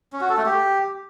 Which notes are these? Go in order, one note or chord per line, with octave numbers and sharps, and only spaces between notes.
C#4
F#4
A4
A3
G4